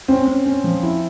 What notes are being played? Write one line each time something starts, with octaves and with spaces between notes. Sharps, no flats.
C4 C#4
C#4
C#4
F3
E4